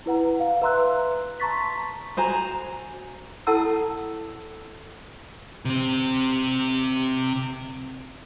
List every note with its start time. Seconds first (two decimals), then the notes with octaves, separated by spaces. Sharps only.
0.06 E4 B4 F#5 A#5
0.40 F5
0.62 B4 E5 A#5 C6 E6 F#6
1.40 A5 A#5 C6 C#6 A6 B6
2.17 F#4 C5 G#5 A#5
3.47 E4 A4 F#5 A5 E6
5.65 C3 C4